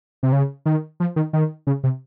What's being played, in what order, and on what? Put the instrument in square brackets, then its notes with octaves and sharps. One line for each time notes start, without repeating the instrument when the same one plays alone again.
[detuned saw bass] C3
C#3
D#3
F3
D#3
D#3
C#3
C3